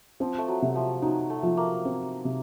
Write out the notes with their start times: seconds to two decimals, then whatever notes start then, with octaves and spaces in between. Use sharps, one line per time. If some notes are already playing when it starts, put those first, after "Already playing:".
0.20 F3 C4
0.38 A3
0.48 F#3
0.62 C3
0.76 F3
1.02 F#3 D#4
1.30 A3
1.43 F3
1.57 A#3
1.85 C4
2.25 C3